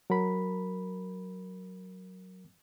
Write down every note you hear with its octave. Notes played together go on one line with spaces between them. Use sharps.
F#3 A#4 B5